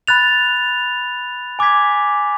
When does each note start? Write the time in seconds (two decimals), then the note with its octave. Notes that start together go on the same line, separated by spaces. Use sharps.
0.08 B5 F#6 A6 F7
1.59 G#5 D6 G#6 B6